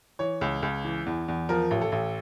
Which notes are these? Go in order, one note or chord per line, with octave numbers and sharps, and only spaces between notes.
E3 C#5
C#2
C#2
E3
E2
E2
F3 A#4
A1
A4
A1